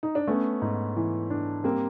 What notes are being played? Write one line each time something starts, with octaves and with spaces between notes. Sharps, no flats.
D#4
D4
A3 B3 C#4
G#2
E3
D4
G3 A#3 C4